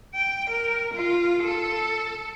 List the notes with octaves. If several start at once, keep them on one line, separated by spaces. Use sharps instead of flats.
G5
A#4
F4
A4